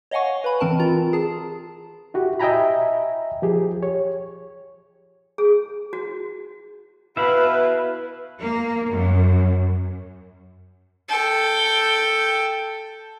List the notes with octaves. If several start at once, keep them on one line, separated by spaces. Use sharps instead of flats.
C#5 D#5 F5 F#5 G#5 C#6
B4 B5
E3 C4 A#4 A5
F4 A#5
G#4 A5
E4 F#4 G4
D#5 E5 G5 G#5 A#5 B5
F3 G4 G#4
C#5
G#4
F#4
B2 E4 B4 E5 F5 B5
A#3
F#2
A4 G5